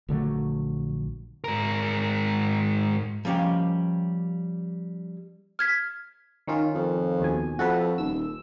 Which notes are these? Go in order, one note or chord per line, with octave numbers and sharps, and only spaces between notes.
A#1 D3 F#3 A3
G#2 A#4
F3 G3 A#3 C#4 G4
F6 G#6 B6
D#3 C#4 F4
F2
D#2 B2 G#5
F2 F#4 A4 B4
D#1 E6